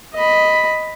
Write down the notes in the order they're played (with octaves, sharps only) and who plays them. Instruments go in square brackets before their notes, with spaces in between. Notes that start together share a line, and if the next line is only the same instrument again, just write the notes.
[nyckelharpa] D#5 B5